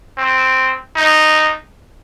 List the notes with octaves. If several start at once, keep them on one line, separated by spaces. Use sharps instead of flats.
C4
D#4